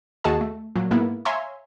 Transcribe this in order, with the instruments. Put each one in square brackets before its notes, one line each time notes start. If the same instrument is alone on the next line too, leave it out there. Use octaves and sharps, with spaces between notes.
[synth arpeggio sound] D#2 F#4 G#4 D#5 A5
A3
A#2 F#3
G#2 A#3 B3 E4
C#5 E5 F5 G#5 A#5 C6